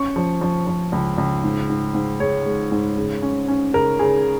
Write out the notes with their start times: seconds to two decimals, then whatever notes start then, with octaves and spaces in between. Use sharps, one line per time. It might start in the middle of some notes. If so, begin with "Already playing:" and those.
Already playing: C#4 C#6
0.16 F3
0.41 F3
0.67 F3
0.92 C#2
1.18 C#2
1.43 G#2
1.69 G#2
1.94 G#2
2.20 G#3 C#5
2.46 G#3
2.72 G#2
2.97 C#3
3.22 C#4
3.48 C#4
3.74 C#3 A#4
3.99 C#3 G#4